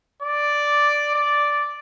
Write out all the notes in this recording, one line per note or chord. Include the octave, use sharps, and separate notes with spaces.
D5
D5